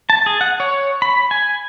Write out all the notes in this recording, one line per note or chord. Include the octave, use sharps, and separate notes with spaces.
A5
G#4
F#5
C#5
B5
G#5